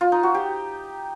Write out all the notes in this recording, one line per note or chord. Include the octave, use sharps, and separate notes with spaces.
F4
D#4
F#4
G4